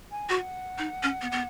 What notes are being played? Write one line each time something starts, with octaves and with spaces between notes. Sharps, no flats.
G#5
F#4 F#5
D#4
C#4
B3
B3